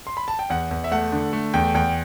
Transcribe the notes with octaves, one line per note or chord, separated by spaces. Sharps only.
C6
B5
A5
G5
E2 F#5
E2
E5
A3 F#5
D3
A3
E2 G5
E2 G5